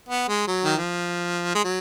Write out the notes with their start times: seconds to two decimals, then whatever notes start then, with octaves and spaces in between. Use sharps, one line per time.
0.09 B3
0.28 G#3
0.47 F#3
0.64 D#3
0.76 F3
1.55 G#3
1.64 F#3